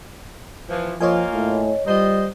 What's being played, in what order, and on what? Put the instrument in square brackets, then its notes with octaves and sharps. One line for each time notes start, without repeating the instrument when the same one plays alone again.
[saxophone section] E3 F3
[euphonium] F3 [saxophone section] A#3 F4 [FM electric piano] C#5 D#5 G#5
[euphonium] A2
[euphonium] G3 [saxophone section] F4 C5 D#5